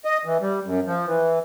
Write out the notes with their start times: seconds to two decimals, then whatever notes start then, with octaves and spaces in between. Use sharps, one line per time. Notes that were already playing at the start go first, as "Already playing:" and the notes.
0.05 D#5
0.25 E3
0.41 G3
0.66 F#2
0.86 F3
1.07 E3